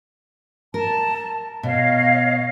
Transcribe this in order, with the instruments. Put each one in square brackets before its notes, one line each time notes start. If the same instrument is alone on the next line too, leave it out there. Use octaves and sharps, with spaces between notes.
[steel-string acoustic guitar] A#4 [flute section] A5
[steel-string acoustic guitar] B2 [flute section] C#5 D#5 F5